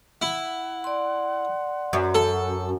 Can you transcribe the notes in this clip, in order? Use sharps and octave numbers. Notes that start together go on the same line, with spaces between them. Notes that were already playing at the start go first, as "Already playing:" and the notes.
E4 F#5
D5 C6
F#2
A4